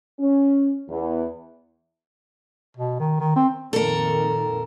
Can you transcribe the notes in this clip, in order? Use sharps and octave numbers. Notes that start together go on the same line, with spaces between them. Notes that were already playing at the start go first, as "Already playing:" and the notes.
C#4
E2
B2
D#3
D#3
C4
F2 A#2 D#3 A4 A#4